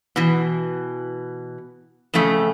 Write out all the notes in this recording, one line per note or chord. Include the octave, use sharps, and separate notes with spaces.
B2 E3
F2 A2 C#3 A3